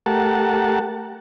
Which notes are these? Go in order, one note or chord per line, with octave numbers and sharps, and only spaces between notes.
A3 G4 A#4 F#5 A5